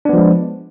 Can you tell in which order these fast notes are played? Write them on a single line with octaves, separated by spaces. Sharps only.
D4 B3 F3 G#3